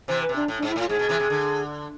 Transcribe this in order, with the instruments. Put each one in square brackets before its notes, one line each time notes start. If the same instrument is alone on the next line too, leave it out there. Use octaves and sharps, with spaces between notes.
[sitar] C3 E3 [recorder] C5
[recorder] B4
[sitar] C3
[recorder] D4
[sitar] A2
[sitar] G#2 [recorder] D4
[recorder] E4
[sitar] A2 [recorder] F4
[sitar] G#2 [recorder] G#4
[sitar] B2
C3 E3
C3
D3